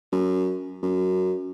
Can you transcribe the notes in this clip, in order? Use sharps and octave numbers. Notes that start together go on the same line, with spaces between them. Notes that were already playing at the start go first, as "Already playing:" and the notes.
F#2
F#2